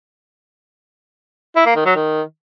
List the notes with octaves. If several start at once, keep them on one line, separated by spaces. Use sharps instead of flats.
E4
A#3
D#3
F#3
D#3